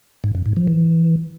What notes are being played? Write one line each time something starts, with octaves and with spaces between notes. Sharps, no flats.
G#2
F#2
G#2
F3
E3